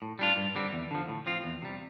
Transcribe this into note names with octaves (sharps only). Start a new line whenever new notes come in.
A2
G3 D4 F4
G2
D3 G3 C4
E2
D3 F3
A2
F3 C4 F4
E2
C3 G3